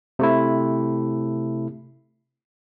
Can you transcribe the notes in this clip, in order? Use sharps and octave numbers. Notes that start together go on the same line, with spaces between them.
C3 A3 E4